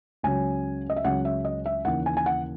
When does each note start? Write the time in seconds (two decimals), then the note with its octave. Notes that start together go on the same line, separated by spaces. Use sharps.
0.23 C#2 C#3 F#3 C#4 G#5
0.90 D#5
0.96 E5
1.05 C#2 C#3 F#3 C#4 F#5
1.25 E5
1.45 D#5
1.66 E5
1.85 D#2 C#3 E3 F#5
2.06 G#5
2.17 G#5
2.26 F#5